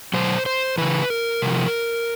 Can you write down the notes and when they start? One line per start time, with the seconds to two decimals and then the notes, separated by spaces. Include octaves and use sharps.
0.14 B2 F#3 C5
0.46 C5
0.78 C#3 E3 B4
1.10 A#4
1.42 C3 F3